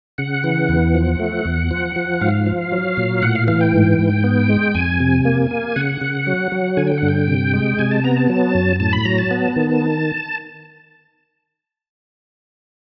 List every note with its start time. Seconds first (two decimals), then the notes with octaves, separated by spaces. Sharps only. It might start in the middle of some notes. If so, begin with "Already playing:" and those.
0.18 C#3 F#5
0.44 E3
0.69 E2
0.95 F3
1.19 A3
1.45 E2
1.71 F3
1.96 F3
2.21 G#2 F5
2.46 F3
2.72 F#3
2.97 A#2
3.22 A2 F#5
3.35 F5
3.47 E3 F5
3.61 G5
3.73 G#2
3.99 G#2
4.24 B3
4.49 G#3
4.74 F2 G#5
5.00 C3
5.25 A#3
5.51 A#3
5.76 C#3 F#5
6.01 C#3
6.27 F#3
6.52 F#3
6.77 D3 G#5
6.87 G5
6.98 G2 F#5
7.08 G5
7.28 C3
7.54 G#3
7.79 C3 G#5
7.91 A5
8.04 B3 A#5
8.17 A5
8.29 F#3
8.55 F#2
8.80 A2 A5
8.93 B5
9.05 F#3 A#5
9.18 A5
9.31 B3
9.56 D#3